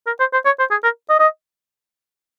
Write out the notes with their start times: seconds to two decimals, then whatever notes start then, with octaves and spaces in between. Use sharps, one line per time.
0.07 A#4
0.20 C5
0.33 C5
0.46 C#5
0.59 C5
0.71 G#4
0.84 A#4
1.09 D#5
1.20 D#5